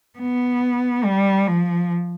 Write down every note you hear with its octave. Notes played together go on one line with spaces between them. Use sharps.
B3
G3
F3